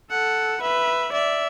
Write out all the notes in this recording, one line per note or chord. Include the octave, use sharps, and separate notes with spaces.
A4 F#5
B4 E5
D5 E5